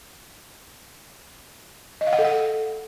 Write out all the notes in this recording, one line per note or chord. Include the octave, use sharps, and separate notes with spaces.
D#5
F5
F#5
A4
F#5